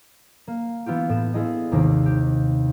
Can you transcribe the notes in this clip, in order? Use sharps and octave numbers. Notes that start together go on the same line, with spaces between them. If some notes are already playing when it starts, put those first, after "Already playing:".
A#3
E3 B3 E4 F4 G4
A2 E7
B3 E4 F4 G#4 D#5
G#1 D#2 C3 D#3 D6
G4